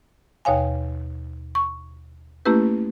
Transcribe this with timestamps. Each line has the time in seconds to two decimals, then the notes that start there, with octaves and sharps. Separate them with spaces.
0.45 D#2 B2 C#5 F5 G#5
1.55 C#6
2.46 A3 A#3 C#4 E4 G4 B4